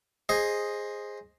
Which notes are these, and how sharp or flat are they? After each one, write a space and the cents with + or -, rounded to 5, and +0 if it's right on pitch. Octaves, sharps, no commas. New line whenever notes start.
G#4 -5 C5 +10 D#5 +0